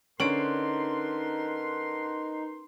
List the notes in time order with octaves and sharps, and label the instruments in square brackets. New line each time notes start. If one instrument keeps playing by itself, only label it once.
[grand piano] D3 D7 F#7 [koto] C#4 [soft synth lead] D#4 [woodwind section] A#4 B4 C6